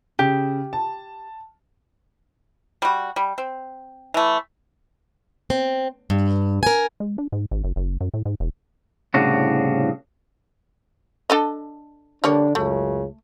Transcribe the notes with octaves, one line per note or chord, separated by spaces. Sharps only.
C#3 G4
A5
G3 F#4
G3
C4
E3 A3
C4
G2
A#4 G#5
G#3
D4
G#2
G#1
F#1
F#1
F#2
A2
G#2
E1
C2 A2 C#3 D4 F#4
D4 A4 D#5
D3 G3 A#3 D4 C#5
C#2 F#2 C#3 A3